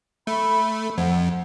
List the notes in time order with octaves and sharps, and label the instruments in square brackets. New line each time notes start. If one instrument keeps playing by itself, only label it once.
[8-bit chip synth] A3 [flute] B5
[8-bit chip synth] F2 [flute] F#5